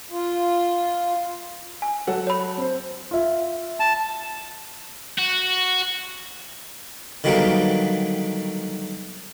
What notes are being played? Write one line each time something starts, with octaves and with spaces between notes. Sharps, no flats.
F4
G#5
F#3 A4 F#5
C#5 B5
C4 C5
F4 E5
A5
F#4
D3 D#3 F#3 G3 A#3 B3